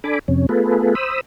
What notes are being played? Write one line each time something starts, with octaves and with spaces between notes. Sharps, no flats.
D4 A4 G#5 B5 D6
F2 C3 C#4
A3 B3 F4 G#4 A4 B4
C5 B5 D#6 E6